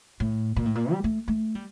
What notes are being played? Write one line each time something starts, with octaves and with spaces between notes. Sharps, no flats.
A2
A#2
A2
A#2
G3
A3
A3
G3